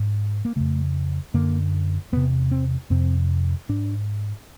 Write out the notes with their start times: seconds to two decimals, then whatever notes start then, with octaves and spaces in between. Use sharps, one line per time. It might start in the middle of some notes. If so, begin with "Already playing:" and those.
Already playing: G#2
0.45 A#3
0.56 F2 C#3 A3
1.34 F#2 D3 A#3
2.12 E2 C3 B3
2.51 C4
2.90 F2 C3 C4
3.69 G#2 D4